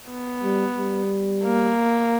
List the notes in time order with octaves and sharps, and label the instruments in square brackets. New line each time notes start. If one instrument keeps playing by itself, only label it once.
[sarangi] B3
[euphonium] G3
G3
[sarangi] A#3